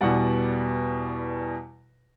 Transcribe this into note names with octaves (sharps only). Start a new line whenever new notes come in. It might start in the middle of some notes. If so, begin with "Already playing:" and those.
E2 B2 G3 D5 F#5